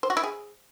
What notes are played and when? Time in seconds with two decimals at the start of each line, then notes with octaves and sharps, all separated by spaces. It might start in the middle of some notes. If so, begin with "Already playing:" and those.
0.03 C5
0.10 F#4
0.17 E4
0.24 G#4